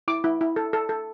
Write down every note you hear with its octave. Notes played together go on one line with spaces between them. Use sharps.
E4 D6
E4
E4
A4
A4
A4